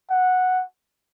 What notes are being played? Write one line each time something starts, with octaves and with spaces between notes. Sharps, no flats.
F#5